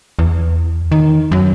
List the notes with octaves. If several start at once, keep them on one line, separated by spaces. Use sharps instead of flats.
E2
D#3
F#2